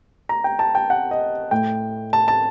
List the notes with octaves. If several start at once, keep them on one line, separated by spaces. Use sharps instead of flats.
A#5
G5
A5
G5
F#5
D#5
A2 G5
A5
A5